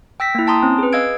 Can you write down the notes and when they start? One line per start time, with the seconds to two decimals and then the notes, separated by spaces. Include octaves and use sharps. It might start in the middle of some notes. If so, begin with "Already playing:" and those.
0.20 G5 E6 A#6 B6
0.35 A#3 E4
0.47 G5 A5 A#5 C6 D#6
0.63 C4 C#4
0.78 G#4 B4
0.93 D#5 F5 E6 G#6 D7